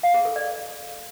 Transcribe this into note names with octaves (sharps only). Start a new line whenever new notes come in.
F5
G#4
A4
D5